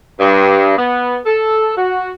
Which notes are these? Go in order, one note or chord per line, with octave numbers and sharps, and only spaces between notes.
G2
B3
A4
F#4